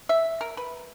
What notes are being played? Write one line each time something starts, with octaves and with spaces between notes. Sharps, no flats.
E5
A#4
B4